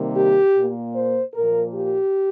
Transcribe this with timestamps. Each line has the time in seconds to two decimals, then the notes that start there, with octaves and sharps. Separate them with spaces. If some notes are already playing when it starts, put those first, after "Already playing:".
Already playing: C3 D#3 G3 A#3
0.15 G4
0.55 A#2 A#3
0.95 C5
1.34 A#2 F3 A#3 A#4
1.75 G4